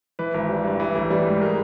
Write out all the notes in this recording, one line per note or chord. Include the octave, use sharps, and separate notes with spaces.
E3 B4
G#1
G3
G2
E3
A1
G3
G#2
G#3 A#4